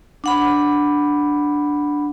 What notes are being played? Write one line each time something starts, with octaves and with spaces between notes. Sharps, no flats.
D4 F#5 B5